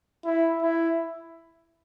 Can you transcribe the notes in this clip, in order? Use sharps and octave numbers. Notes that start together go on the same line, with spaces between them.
E4
E4